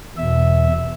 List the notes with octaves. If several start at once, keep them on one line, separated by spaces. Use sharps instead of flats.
E2 B2 E5